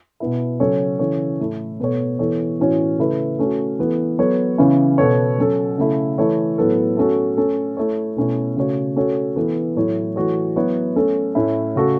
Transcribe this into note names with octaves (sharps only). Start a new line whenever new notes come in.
B2 B3 E4
C#3 F#3 C#4 A4 C#5
C#3 E3 C#4 A4 C#5
A2 A3 E4 A4
B2 B3 A4 C#5
E3 B3 A4 C#5
A2 E3 C#4 F#4 C#5
C#3 A3 E4 B4
A3 C#4 F#4
E3 B3 A4
F#3 B3 A4 C#5
C#3 E3 C#4 E4
B2 B3 A4 C#5
F#3 C#4 A4
C#3 A3 E4 A4
E3 A3 E4 A4 C#5
A2 F#3 B3 A4
A3 C#4 F#4 A4
A3 C#4 A4
A3 E4 C#5
B2 A3 C#4 E4 C#5
C#3 A3 F#4 C#5
A3 C#4 F#4 A4 C#5
E3 B3 A4
A2 F#3 A3 E4 C#5
E3 A3 F#4 C#5
F#3 B3 E4 C#5
A3 C#4 A4
A2 A3 C#4 E4
C#3 A3 F#4 A4